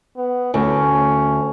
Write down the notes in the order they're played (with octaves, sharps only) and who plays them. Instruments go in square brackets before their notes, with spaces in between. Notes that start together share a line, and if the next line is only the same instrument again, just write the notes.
[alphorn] B3
[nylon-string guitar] D2 [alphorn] C#4